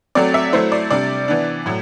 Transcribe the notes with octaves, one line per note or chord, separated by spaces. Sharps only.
F#3 A3 C4 D5
E5
F#3 A3 E4 C5
D5
C3 G3 D4 D5
E3 B3 D4
A2 F#3